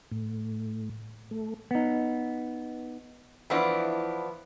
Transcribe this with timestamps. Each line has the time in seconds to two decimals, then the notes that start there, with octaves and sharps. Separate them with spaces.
0.11 A2
1.31 A3
1.71 B3 D#4
3.50 E3 F3 B3 D4 E4